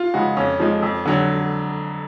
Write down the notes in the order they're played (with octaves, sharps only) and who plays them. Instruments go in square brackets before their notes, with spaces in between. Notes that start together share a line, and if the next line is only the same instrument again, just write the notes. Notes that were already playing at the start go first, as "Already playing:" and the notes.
Already playing: [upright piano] F4
C#3 F3 G#3 F#4
F2 C#4
F3 G#3
F2
D3 F#3